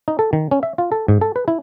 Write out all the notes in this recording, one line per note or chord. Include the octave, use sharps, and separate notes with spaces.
D#4
A4
D#3
C#4
E5
F4
A4
G#2
A4
B4
E4